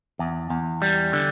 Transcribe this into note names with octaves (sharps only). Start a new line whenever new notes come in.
E2
E2
G3
D3